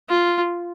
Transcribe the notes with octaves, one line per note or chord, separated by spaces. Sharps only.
F4